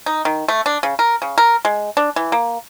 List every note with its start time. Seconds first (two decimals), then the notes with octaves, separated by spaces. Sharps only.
0.06 D#4
0.25 D#3
0.48 A3
0.66 D4
0.83 C#3
0.99 A#4
1.22 C#3
1.38 A#4
1.65 G#3
1.97 D4
2.16 E3
2.32 A#3